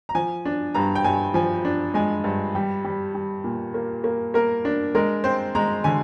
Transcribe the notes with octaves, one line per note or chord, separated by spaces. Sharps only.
A#5
F3 G#5
D4
G2 A#5
G5
G2 G#5
F3 G#5
D4
G#3 G#5
G2
G3 G5
G3
G3
A#2
A#3
A#3
A#3 A#4
D4
G#3 A#4
C4 C5
G#3 A#5
D3 G#5